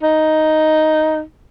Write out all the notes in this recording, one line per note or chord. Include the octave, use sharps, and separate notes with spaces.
D#4